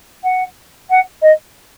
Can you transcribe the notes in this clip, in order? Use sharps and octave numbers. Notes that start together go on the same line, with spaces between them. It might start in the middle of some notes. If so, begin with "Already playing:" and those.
F#5
F#5
D#5